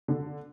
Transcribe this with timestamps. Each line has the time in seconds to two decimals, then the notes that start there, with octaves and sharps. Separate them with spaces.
0.08 D3